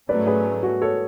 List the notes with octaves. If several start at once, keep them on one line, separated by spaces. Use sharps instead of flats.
G#2 F#3 A3 C#4 B4 D5
G#4 B4
F#4
A4 C#5